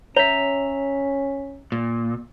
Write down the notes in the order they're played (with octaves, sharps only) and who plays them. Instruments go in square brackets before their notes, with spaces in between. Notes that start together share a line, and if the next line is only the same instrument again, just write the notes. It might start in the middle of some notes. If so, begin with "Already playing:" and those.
[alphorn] C#4 [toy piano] C#5 [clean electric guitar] E5 A#5
[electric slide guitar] A#2